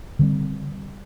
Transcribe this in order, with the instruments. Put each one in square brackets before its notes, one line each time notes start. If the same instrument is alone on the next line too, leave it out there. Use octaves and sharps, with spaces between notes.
[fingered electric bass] D3 G3 C4